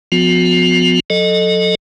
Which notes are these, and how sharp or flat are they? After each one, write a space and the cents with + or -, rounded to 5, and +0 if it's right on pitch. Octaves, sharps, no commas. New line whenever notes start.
F3 +20 B3 +35 F#4 -40
F#3 -30 A4 +0 D#5 -15